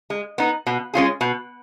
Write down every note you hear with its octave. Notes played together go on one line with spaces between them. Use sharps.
G#3
B3 D#4
B2
G#3 C#4 F4 G#4
B2